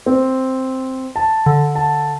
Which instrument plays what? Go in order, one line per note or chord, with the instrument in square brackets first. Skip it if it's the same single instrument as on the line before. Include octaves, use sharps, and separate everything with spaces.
[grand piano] C4
A5
[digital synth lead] D3
[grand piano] A5